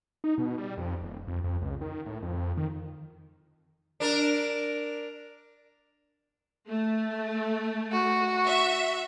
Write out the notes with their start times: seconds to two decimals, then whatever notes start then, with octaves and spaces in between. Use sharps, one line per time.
0.24 D#4
0.38 B2
0.58 G3
0.77 F2
1.02 D#1
1.27 F2
1.44 F2
1.62 C#2
1.81 D#3
2.06 A2
2.22 F2
2.57 D#3
4.00 D4 A#4
6.69 A3
7.92 F#4
8.45 E5